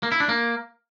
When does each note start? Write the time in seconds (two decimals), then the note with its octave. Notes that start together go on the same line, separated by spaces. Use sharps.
0.03 A#3
0.12 E4
0.20 D4
0.29 A#3